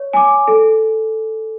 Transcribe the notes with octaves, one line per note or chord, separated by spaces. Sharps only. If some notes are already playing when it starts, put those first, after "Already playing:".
Already playing: C#5
G#5 D6
A4